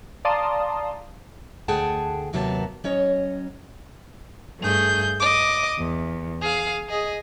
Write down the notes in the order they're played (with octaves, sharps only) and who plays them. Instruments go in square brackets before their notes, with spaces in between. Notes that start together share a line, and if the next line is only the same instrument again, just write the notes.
[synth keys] D5 F5 A5 A#5 C6 D#6
[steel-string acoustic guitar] D2 A3 G#4 F#5 G5 A5
D#2 C3 F#3 A#3 B3 A5
F#3 C#4 C#5 D#5
[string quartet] G2 A3 G#4 G6
D#5 D6
E2
G#4 F5
G#4 D#5